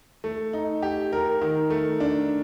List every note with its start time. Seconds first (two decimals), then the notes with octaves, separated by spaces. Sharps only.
0.24 A3
0.53 D#4
0.82 G4
1.12 A#4
1.41 D#3
1.70 A3
2.00 D4